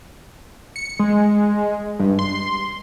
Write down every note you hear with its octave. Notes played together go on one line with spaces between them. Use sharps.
C#7
G#3
G2
C6